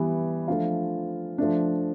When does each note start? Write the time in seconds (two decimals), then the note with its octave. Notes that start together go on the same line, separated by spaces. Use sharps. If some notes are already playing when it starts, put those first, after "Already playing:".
Already playing: E3 G3 B3
0.48 F3 A3 D4 F4
1.38 F3 A3 D4